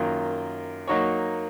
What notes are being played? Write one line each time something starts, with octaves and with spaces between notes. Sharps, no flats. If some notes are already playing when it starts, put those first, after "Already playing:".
Already playing: F#2 D#3 A#3 F4
F#3 A#3 D#4 F#4 C#5